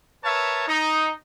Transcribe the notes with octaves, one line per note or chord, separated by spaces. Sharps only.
A#4 B4 C#5 E5 A5
D#4